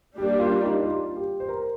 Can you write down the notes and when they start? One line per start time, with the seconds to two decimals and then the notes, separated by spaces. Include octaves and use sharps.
0.18 G3 A#3 D4 G4
0.40 F4
0.62 D#4
0.84 F4
1.16 G4
1.40 C5
1.49 A#4